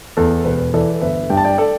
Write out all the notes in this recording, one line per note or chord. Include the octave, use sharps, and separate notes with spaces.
E2 A4
E1 B4
E3 A4 D5
G1 B4 E5
G2 G5
A5
D5 G5
A4 D5